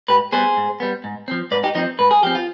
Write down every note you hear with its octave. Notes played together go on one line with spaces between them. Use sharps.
G#2 G4 B4
G3 B3 G#4 C5
G#2
G3 B3
G#2
F3 C4
G#2 B4 D5
D#4 G4
F3 C4 D#4
G#2 B4
G#4
F3 C4 G4
F4